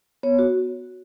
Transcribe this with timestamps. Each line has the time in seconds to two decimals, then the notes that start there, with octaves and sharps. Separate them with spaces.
0.23 B3 C#5
0.39 F#4